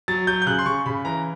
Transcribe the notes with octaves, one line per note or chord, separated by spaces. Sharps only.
F#3 A6
F#3 G6
G6
C#3 F#6
C6
C#3 C#6
C#3 B5
E3 A#5